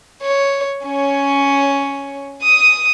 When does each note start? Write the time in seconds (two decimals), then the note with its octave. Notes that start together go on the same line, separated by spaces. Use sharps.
0.22 C#5
0.85 C#4 C#5
2.43 D#6 D#7